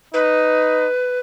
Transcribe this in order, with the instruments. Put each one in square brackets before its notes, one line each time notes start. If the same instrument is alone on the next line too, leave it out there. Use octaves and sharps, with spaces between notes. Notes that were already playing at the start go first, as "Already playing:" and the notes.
[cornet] D#4 [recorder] B4